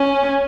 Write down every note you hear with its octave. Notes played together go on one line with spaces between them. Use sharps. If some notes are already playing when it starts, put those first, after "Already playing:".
Already playing: C#4